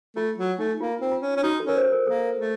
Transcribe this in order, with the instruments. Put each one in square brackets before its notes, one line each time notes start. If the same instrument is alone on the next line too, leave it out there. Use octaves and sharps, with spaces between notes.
[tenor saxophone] A3 [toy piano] F4
[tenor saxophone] F#3
[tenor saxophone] A3 [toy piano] D#4
[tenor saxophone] A#3 [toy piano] F4
[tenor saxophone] C4
[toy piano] F4
[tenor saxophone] C#4
C#4
[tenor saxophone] D#4 [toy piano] F#4
[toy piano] A4
[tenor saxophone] C#4 [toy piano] A#4
[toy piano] C5
A#4
[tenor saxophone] A#3 [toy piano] A4
[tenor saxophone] A3